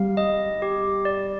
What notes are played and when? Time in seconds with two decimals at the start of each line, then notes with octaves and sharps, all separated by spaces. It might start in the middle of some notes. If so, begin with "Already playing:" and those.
Already playing: G3 F5
0.17 D#5
0.62 G4
1.05 D5